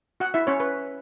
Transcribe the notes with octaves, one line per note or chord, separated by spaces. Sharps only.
F#4 F#5
E4 E5
C#4 C#5
B4